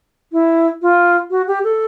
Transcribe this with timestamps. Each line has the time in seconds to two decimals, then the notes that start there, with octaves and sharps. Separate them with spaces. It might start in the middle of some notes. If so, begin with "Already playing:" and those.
0.32 E4
0.82 F4
1.30 F#4
1.48 G4
1.64 A4